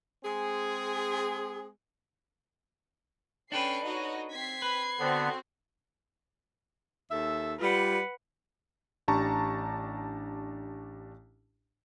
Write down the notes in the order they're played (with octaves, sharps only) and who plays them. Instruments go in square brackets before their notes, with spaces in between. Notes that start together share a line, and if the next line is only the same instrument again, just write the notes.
[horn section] G#3 C4 G#4
[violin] C#4 G5 [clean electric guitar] D4 A4 B4 [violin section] C7
[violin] D#4 D#5 [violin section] F#4 C#5
[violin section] C4 B6 [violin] G#6 C7
[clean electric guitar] B4
[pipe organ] D3 B3 [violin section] C4 F#4 C5
[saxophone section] D#2 A4 E5
[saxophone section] G3 F4 [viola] B4 F#5
[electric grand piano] A1 D4 G4 A5 A#5 C#6